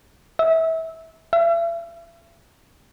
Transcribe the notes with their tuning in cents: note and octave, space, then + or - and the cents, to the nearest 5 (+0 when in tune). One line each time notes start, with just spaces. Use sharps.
E5 -25
E5 +40